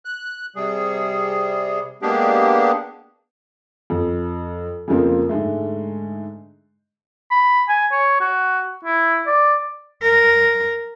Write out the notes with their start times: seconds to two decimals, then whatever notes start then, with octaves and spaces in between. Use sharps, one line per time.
0.05 F#6
0.56 C3 G3 G#4
2.02 G#3 A#3 B3 D4 G4 G#4
3.90 F2
4.88 F2 C#3 F3 A#3 C4
5.29 G#2 D3 G#3 A3
7.31 B5
7.69 G#5
7.92 C#5
8.20 F#4
8.85 E4
9.27 D5
10.02 A#4